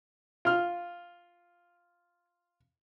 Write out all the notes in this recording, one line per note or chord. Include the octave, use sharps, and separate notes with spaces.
F4 F6